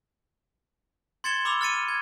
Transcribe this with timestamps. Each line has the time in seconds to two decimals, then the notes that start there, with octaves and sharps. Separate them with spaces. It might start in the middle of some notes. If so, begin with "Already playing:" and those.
1.24 C6 G#6 A6 C#7 E7 G7
1.45 B5 D6 E6 F7 G7
1.61 F6 A6 C#7 D#7
1.88 G#6